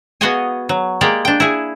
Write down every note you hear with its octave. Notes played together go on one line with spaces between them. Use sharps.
B3 F#4 G#4 D#5 F5 G#5
F#3
G#3 A#3 G4 D5
D4 G5
E4 G#4